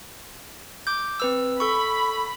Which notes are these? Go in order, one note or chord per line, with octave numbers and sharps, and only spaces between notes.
D6 G6
C4 B4 E6
A4 B5 C#6